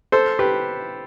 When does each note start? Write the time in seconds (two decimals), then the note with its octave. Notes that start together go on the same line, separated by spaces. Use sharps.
0.12 A4 C5
0.39 G4 B4